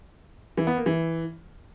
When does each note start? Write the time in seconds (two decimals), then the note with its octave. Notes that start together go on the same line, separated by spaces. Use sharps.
0.57 E3
0.67 B3
0.77 A#3
0.86 E3